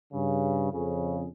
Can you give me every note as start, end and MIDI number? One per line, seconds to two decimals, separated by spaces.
0.13 0.69 43
0.13 0.69 49
0.72 1.27 41
0.72 1.27 49